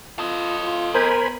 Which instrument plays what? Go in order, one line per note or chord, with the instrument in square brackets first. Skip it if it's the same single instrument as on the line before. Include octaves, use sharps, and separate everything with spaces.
[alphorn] F4 [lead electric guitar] A4 D#5
[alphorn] F4
[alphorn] B3 [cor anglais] A#4 [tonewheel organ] C5 G#5 B5